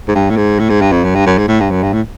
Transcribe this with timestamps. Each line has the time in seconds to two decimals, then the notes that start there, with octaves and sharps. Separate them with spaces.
0.08 G#2
0.15 G2
0.30 A2
0.37 G#2
0.59 A2
0.70 G#2
0.81 G2
0.92 F2
1.04 F#2
1.15 G2
1.26 F#2
1.38 G#2
1.48 A2
1.60 G2
1.71 F#2
1.83 G2
1.93 A2